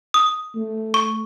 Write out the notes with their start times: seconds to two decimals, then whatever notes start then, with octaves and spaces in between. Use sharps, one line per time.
0.14 D#6
0.56 A3
0.94 C#6